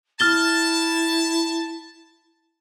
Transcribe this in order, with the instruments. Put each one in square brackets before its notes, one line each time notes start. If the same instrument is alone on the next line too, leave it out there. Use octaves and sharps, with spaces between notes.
[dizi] E4 [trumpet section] A5 [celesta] F6 A6 G7